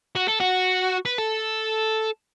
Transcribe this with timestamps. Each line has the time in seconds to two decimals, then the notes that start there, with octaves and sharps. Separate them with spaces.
0.15 F#4
0.28 A4
0.40 F#4
1.05 B4
1.18 A4